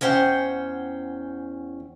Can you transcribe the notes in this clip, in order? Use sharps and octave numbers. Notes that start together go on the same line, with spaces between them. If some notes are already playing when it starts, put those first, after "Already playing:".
E2 C#4 C5 F#5 G5